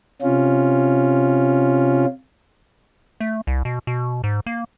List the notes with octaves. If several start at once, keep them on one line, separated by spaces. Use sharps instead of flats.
C3 C#4 F4
A3
C2
B2
B2
G#2
A#3